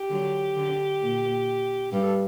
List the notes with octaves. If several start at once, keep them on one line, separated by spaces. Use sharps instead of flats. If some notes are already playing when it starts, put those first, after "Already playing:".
Already playing: G4
D3 F#3
D3
A#2
G2 G4
A4